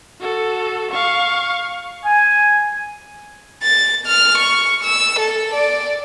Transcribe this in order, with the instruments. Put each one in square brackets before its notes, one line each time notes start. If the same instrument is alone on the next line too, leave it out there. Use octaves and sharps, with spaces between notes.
[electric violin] F#4 A4
F5 C#6
[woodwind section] G#5
[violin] A6
F6
C#6
E6
A4
D5